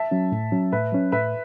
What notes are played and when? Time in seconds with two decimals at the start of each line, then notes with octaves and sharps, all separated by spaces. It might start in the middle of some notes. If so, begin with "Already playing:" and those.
Already playing: E5 A5
0.11 F#3 C#4
0.32 A2
0.52 F#3 C#4
0.72 A2 B4 E5
0.92 F#3 C#4
1.12 A2 B4 E5